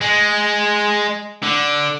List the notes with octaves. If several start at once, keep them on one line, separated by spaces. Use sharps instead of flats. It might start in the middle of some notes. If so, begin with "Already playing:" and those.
G#3
D3